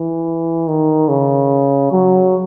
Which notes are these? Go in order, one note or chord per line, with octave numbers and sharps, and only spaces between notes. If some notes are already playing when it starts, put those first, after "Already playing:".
Already playing: E3
D#3
C#3
F#3